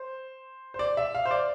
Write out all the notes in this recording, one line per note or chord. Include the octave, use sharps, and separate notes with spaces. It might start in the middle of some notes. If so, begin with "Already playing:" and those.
Already playing: C5
C5
D5
E5
F5
C5
D5